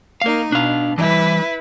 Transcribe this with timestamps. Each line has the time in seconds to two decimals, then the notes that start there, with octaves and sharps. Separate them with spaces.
0.22 A#3 D#4 A#4 F5
0.52 B2 D4 F5
0.98 E3 G3 E4 B4